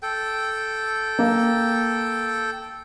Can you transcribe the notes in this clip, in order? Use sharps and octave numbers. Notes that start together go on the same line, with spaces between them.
A4 G5
A#3